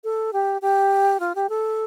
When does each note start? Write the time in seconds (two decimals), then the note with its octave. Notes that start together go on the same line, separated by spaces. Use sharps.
0.04 A4
0.33 G4
0.62 G4
1.20 F4
1.35 G4
1.49 A4